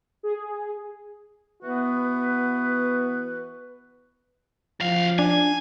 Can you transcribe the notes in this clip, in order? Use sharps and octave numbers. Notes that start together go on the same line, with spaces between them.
G#4
E3 B3 F#4 B4
F#2 F3 F5
D4 G#5